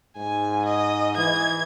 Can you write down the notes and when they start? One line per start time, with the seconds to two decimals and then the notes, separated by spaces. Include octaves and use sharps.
0.17 G#2 G#5
0.65 D#5
1.17 E3 G#6